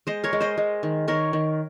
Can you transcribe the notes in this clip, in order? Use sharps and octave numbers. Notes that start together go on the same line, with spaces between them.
G#3 C5 D#5
A#4 C#5
G#3
C5 D#5
G#3
D#3
D#3 A#4 C#5
D#3